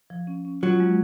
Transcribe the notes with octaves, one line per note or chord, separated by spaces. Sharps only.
F3
C#4
C#4
F#3 F4
G#3